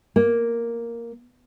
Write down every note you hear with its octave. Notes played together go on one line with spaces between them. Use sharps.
A#3